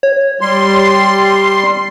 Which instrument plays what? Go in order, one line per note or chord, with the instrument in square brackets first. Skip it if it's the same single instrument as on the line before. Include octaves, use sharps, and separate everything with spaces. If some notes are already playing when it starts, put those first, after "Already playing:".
[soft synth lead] C#5
[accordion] G3 C6
[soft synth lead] C7